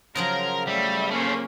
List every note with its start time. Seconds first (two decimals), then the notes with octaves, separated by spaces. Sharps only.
0.15 C#3 F3 F#3 A#4 C6
0.68 G3 A3 E5
1.11 A3 A#3 C4 C#4